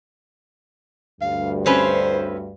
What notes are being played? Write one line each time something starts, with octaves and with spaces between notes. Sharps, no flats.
D2 G2 F5
C4 C#4 B4 C5